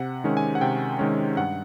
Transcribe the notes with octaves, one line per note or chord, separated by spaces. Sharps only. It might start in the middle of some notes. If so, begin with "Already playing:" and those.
Already playing: C3 F#5
D#3 G#3 C#4
G#5
F#5
C3 G5
D#3 G#3 C#4
G2 F#5